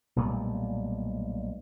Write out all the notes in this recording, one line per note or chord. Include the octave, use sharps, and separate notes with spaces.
B1 A#2 G3 A3